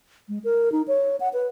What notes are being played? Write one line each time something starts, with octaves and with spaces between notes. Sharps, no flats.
G#3
A#4
D#4
C#5
F#5
B4